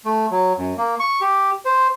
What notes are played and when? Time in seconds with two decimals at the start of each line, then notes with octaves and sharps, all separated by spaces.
0.05 A3
0.31 F#3
0.57 F#2
0.77 A#3
1.00 C#6
1.21 G4
1.65 C5